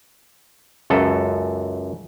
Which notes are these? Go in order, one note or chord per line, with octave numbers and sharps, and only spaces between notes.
C#2 F#2 A4